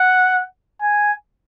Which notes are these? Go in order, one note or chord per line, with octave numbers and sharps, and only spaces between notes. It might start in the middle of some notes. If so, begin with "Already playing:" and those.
Already playing: F#5
G#5